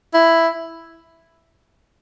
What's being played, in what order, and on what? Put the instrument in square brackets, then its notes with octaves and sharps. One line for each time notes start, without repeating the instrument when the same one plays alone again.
[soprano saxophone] E4